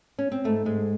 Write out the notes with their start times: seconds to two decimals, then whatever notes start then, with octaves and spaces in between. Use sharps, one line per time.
0.19 C#4
0.32 C4
0.44 G#2 A3
0.65 G#2 G#3